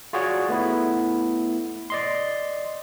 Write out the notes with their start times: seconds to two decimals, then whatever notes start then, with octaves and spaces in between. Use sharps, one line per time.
0.13 F4 F#4 G#4 C#5 D5 F#5
0.49 A3 B3 E4
1.90 D5 D#5 C6